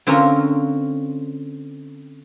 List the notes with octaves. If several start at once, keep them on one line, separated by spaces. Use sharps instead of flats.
D3 C4 C#4 F4 A#4